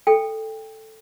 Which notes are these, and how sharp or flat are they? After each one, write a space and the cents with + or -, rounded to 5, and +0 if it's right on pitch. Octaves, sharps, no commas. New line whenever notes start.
A4 +0 G5 +20